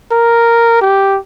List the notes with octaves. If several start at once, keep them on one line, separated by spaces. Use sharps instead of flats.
A#4
G4